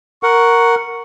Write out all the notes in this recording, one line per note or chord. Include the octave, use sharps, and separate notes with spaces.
A#4 F#5 C#6